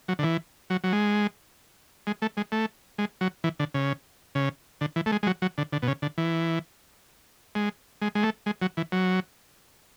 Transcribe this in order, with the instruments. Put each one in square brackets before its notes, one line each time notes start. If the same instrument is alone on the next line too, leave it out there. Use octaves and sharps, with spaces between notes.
[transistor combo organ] F#3
D3
E3
F#3
F#3
G#3
G#3
A3
G#3
A3
G#3
F#3
E3
D3
C#3
C#3
D3
E3
A3
G#3
G#3
F#3
F#3
D3
D3
B2
C#3
D3
E3
G#3
G#3
G#3
A3
G#3
F#3
E3
F#3